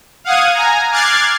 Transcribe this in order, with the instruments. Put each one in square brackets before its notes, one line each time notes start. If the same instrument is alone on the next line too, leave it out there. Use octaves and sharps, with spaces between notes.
[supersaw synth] F5 F#5 D#6 G#6 D#7
G#5 A#5
D6 F6 F#6 G#6 A6 C7